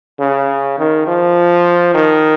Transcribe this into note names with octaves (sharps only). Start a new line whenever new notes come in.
C#3
D#3
F3
D#3